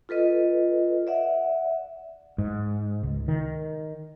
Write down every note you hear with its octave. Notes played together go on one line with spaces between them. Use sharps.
F4 A4 B4 D#5
D5 E5 F#5
G#2
C#2
D#3